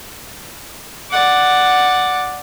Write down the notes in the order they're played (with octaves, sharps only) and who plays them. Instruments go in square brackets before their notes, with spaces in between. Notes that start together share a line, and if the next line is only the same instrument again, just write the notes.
[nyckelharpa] D5 F#5